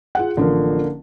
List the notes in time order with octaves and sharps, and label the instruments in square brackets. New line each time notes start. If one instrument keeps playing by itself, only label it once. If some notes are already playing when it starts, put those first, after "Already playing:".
[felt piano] F4 G#4 F#5
[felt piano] A1 F3 [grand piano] D3 A#3